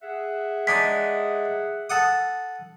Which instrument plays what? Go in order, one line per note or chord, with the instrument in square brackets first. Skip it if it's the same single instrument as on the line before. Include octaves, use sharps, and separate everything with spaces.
[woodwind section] G#4 E5 F#5
[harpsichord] G#3 D4 D#4 [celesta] B6
[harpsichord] A4 F#5 D#6